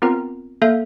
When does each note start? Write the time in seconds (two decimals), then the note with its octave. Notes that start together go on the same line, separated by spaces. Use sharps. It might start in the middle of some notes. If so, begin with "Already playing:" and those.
0.02 B3 C4 F4 A#4 A#5
0.62 A#3 A4 E5 F5 G6